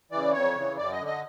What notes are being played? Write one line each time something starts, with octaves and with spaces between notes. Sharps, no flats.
C#3 E3 D5
F2 C#5
C#3 E3
F#2 D5
D#5
D3
D#5